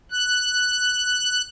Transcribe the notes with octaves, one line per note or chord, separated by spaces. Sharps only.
F#6